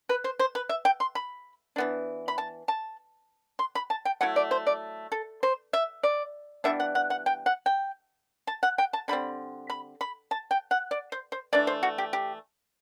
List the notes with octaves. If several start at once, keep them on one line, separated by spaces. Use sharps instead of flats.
B4
C5
C5
B4
E5
G5
C6
B5
E3 B3 D4
B5
A5
A5
C6
B5
A5
G5
F#3 A3 E4 F#5
D5
C5
D5
A4
C5
E5
D5
E3 G3 B3 D4 E5
F#5
F#5
F#5
G5
F#5
G5
A5
F#5
G5
A5
D3 G3 C4 B5
B5
B5
A5
G5
F#5
D5
C5
C5
E3 A3 D4 D5
C5
F#4
G4
G4